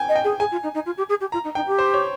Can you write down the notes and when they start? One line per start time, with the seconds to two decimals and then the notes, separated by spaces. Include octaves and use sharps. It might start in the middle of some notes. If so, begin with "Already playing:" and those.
Already playing: G5 G#5
0.09 D#5
0.16 G5
0.24 G#4
0.39 G#4 G#5
0.51 F4
0.63 D#4
0.74 D#4
0.85 F4
0.97 G4
1.09 G#4
1.20 G4
1.32 F4 A#5
1.44 D#4
1.55 D#4 G5
1.67 G4
1.79 C5
1.94 C#5